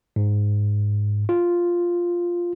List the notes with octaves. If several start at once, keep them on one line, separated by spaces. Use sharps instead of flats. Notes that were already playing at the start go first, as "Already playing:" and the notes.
G#2
F4